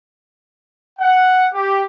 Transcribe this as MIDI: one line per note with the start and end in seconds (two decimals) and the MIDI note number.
0.99 1.47 78
1.54 1.82 67